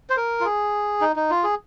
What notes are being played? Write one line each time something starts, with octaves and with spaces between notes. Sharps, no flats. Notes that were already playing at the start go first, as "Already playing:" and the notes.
C5
A#4
F4
G#4
D#4
D#4
F4
G#4